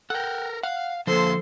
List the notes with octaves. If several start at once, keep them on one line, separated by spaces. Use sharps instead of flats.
A4 A#4 F#5 G5
F5 F#5
D3 F3 A#3 A4 C5 C6